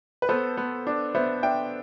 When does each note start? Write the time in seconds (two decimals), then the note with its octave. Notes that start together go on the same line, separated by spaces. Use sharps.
0.22 B4
0.29 B3 A4 C5
0.57 B3
0.87 D4
1.15 B3 C5 E5
1.43 D4 E5 G5